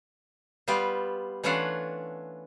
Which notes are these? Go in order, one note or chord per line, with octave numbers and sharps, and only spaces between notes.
G3 B3 F4 G4
E3 A3 C#4 D4 F4 F#5